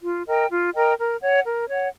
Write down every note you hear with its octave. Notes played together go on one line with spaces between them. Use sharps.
F4
A#4 D#5 G5
F4
A#4 D#5 G5
A#4
C#5 F#5
A#4
C#5 F#5